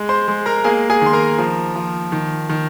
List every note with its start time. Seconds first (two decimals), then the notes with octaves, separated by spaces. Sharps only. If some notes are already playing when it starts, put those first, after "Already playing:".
Already playing: G#3
0.09 C5 C6
0.28 G#3
0.46 A#4 A#5
0.64 A#3 G#4 G#5
0.90 G#4 G#5
1.01 D#3 C6
1.13 A#4 A#5
1.38 F3
1.76 F3
2.12 D#3
2.49 D#3